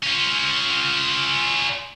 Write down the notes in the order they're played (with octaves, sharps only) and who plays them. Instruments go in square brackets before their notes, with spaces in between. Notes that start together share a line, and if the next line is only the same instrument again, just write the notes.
[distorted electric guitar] C#4 F4